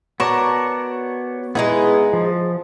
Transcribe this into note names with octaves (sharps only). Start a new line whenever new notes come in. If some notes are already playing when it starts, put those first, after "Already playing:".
B3 F#4 A#4 C#5 D5 A5
G#3 B3 D#4 E4 G#4 B4
F3